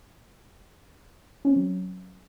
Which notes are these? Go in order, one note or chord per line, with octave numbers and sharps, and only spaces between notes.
C#4
C4
F#3